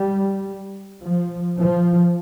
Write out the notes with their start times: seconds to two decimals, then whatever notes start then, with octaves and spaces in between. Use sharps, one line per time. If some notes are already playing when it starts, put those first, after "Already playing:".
Already playing: G3
1.02 F3
1.58 F3